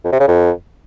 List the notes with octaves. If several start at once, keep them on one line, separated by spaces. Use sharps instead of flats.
F2
C3
C#3
F2